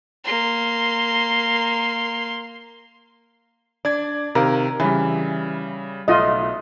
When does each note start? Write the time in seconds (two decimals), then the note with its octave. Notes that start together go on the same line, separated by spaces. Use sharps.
0.24 A#3 C6
3.85 D4 D5 G#6
4.35 C3 D#3 A#4 F5
4.80 C#3 E3 G3
6.08 B1 A3 F4 D#5